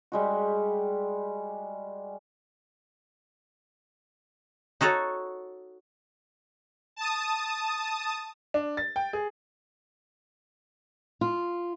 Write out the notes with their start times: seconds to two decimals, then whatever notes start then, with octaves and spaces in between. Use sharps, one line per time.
0.12 G3 G#3 F#4
4.81 D#4 F#4 A4 C#5
6.96 A5 D#6
8.54 D4
8.77 A6
8.96 G5
9.13 G#4
11.21 F4